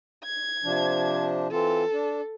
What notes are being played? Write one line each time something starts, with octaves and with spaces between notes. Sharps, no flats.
G#6
C3 F3 D4
E3 C4 F4 A4
D4